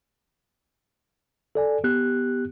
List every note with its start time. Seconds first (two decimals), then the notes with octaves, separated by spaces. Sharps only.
1.55 A4 D5 G#5
1.84 B3 G4 F#6